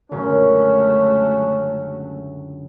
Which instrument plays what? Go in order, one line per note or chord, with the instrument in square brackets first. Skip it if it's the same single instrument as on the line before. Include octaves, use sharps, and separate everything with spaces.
[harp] C#2 F#2 A#2 [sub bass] D3 [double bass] F#3 A3 [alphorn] C#4